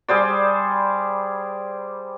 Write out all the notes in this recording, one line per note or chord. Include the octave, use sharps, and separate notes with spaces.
G3 G#4 C5 D5